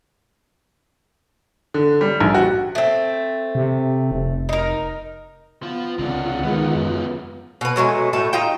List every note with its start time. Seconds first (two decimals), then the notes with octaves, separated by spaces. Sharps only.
1.74 D3
2.01 G3
2.20 A#1
2.34 F#4
2.75 A3 C4
3.55 C3
4.11 F1
4.49 D#4 A#4
5.63 F3 B3 F4
5.99 C#2 C3 D4 F4 F#5
6.44 D#3 F3 G#3 B3
6.75 F#2
7.61 B2 B4
7.76 B2 F#3 G#3 A3
8.13 A2 A3 A5
8.33 D#4 F4 G5